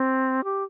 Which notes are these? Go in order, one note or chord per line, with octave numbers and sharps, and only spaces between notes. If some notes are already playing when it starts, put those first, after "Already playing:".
Already playing: C4
G4